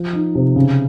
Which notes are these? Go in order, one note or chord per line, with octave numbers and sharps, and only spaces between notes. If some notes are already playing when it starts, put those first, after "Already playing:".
Already playing: F3
D#4
C3
C#3